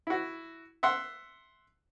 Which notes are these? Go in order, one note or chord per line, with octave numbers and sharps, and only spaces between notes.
E4 F#4
E5 F#5 C6